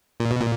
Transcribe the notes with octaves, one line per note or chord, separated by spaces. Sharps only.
A#2
B2
A#2